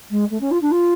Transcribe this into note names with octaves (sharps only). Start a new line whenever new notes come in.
G#3
A3
C#4
F4
D4
F4